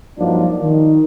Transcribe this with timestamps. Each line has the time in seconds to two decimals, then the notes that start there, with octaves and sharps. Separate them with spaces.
0.19 G2 F3 F#3 A#3 D4 D#4
0.62 D#3